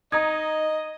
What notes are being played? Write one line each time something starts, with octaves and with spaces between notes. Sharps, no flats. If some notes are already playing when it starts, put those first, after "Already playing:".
D#4 D#5 A#5 D#6 G#6